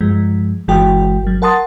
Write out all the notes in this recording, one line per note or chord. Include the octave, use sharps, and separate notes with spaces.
G2 F3 G#3
G1 E3 G#3 F#4 G5
G1 F#3
A#4 F#5 A5 C6 D#6 A6